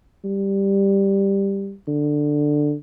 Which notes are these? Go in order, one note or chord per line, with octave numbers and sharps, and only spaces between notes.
G3
D3